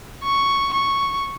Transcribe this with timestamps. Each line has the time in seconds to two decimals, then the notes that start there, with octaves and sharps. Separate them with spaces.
0.23 C#6
0.74 C#6